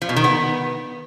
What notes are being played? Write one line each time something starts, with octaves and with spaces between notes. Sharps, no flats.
F3
B2
D#3
B3